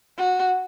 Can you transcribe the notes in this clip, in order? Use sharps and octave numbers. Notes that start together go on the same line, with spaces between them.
F#4